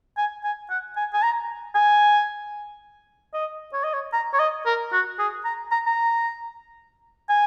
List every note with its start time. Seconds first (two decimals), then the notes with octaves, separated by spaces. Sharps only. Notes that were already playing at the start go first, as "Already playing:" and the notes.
0.17 G#5
0.44 G#5
0.70 F#5
0.97 G#5
1.14 G#5
1.23 A#5
1.75 G#5
3.34 D#5
3.73 C#5
3.84 D#5
3.94 C#5
4.13 A#5
4.34 C#5
4.40 D#5
4.66 A#4
4.93 F#4
5.19 G#4
5.45 A#5
5.72 A#5
5.86 A#5
7.30 G#5